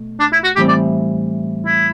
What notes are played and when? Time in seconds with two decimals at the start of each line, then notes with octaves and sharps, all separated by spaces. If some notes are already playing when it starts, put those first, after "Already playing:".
Already playing: B2 A3
0.20 D4
0.33 E4
0.44 F#4
0.56 A2 E3 G3 C4 G4
0.68 D5
1.67 E4